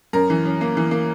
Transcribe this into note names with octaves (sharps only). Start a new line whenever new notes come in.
F#2 A#4
E3
F#2
A#3
E3
A#3